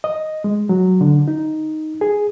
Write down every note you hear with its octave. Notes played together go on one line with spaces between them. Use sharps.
D#5
G#3
F#3
D3
D#4
G#4